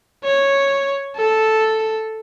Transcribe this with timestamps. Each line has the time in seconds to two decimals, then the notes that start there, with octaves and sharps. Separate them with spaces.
0.24 C#5
1.16 A4